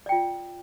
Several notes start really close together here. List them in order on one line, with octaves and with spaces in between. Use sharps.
D5 G5 F4